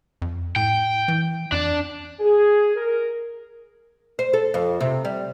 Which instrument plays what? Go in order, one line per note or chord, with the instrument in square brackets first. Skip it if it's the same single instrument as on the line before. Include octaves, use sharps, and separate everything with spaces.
[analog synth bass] F2
[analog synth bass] A2 [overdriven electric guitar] G5
[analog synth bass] E3
[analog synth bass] F2 [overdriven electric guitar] D4 D5
[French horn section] G#4
A#4
[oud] C5
A4
F2
C3
G3